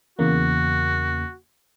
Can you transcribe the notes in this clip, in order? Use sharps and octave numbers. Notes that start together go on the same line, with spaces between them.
E2 C#3 A#3 F#4